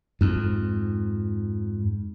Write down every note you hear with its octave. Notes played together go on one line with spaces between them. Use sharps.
F2 G#2